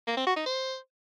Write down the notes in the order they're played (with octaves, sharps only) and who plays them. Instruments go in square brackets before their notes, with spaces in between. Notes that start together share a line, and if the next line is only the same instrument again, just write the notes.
[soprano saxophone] A#3
C4
F#4
D#4
C5